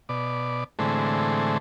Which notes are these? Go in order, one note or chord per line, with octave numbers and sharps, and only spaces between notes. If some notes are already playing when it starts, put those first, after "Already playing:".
B2 D5
A2 D3 E3 G#3 A3 C4